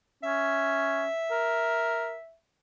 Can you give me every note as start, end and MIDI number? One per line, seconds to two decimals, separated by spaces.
0.23 1.07 61
0.23 2.35 76
1.31 2.16 70